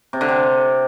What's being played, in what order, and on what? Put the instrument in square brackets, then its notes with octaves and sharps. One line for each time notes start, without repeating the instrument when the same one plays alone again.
[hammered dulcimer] C3
D3
C3